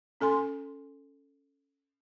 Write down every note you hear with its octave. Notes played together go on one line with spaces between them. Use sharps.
C#4 A4 G#5 C6